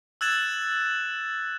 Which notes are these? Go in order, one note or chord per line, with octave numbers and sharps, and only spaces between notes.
E6 F#6 G#6 A6 E7 F#7